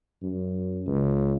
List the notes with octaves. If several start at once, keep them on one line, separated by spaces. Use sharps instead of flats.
F#2
C#2